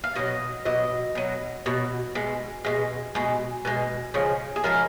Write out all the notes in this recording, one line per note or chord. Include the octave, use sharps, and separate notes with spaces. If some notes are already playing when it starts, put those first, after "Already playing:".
F5
B2 F#3 D#5
B2 F#3 D#5
B2 F#3
B2 F#3
B2 G#3
B2 G#3
B2 G#3
B2 G#3
C#3 F3 G#3
G#4
C#3 F3 G#3 A#4